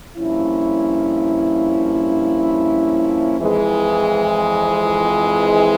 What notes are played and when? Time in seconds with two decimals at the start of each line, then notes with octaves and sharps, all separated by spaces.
0.16 G2 F3 A#3 C#4 E4
3.38 F2 E3 G#3